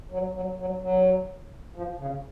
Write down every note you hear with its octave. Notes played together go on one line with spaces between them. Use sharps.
F#3
F#3
F#3
F#3
F3
C#3